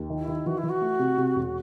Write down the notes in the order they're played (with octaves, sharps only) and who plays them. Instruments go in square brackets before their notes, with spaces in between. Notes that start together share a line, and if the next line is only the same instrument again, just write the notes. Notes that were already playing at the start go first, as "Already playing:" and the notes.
Already playing: [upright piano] D#2
D#3
[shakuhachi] E4
[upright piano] D#3
[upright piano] E3 [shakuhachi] F#4
[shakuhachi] E4
[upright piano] E3
[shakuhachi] F#4
[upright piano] A3
C3
C3
E1